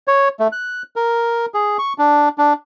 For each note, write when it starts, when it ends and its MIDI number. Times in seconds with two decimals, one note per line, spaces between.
0.08 0.29 73
0.40 0.48 57
0.52 0.82 90
0.96 1.46 70
1.54 1.77 68
1.78 1.93 85
1.98 2.29 62
2.38 2.53 62